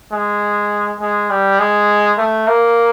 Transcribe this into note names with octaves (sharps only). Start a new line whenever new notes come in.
G#3
G#3
G3
G#3
A3
A#3